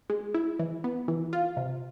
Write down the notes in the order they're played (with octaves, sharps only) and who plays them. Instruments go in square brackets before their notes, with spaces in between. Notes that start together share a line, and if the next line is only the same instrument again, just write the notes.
[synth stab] G#3
E4
E3
B3
E3
F4
C3